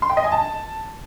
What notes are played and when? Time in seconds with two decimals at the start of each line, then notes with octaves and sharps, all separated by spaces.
0.02 C6
0.10 G5
0.17 D#5
0.24 G#5
0.32 A5